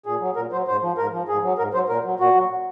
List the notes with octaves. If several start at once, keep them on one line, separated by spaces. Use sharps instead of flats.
A#2 G#4
F#3
A#2 A#4
F#3 C5
G#2 C5
F3
G#2 A#4
F3
G#2 G#4
F#3
G#2 A#4
F#3 C5
A#2 A#4
F#3
A#2 F#4
F#3